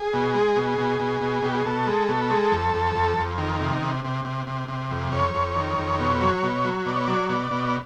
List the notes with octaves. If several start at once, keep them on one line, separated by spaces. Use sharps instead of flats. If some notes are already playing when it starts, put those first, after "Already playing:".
Already playing: G#4
B2
G#3
B2
B2
B2
B2
B2 G4
G#4
B2 A4
G#3
B2
G#3
F2
F2
F2
F2
D#3
C3
C3
C3
C3
C3
C3
F2
F2 C#5
F2
D#3
F2
B2
F#3
B2
F#3
B2 D5
C#5
F#3 D5
B2 D5
B2
D5